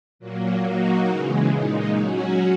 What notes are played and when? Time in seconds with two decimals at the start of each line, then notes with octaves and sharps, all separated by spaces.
0.19 A#2 F#3 A#3
0.64 F#3 A#3 D#4 F#4
1.08 C#3 E3 G#3
1.51 A#2 G#3 D#4
1.96 F#3 C#4 F#4